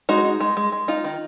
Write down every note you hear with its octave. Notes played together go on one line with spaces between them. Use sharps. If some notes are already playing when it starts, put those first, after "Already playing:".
G#3 D#4 F#4
D#4
G#3
G#3
G#3
D#4 F4
D#3